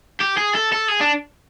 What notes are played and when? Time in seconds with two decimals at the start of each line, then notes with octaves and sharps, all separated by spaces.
0.20 G4
0.37 G#4
0.55 A4
0.72 A4
0.88 G#4
1.01 D4